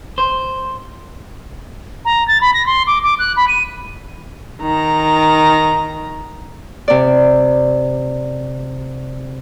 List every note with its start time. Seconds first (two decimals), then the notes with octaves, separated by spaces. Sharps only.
0.18 C5
2.05 A#5
2.28 A6
2.41 B5
2.54 A#6
2.66 C6
2.87 D6
3.03 D6
3.19 F#6
3.36 B5
3.48 D#7
4.61 D#3 A#5
6.88 C3 D5